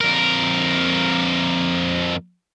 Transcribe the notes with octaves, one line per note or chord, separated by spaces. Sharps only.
F2 A#4